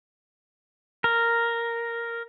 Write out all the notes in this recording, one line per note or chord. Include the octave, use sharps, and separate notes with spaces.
A#4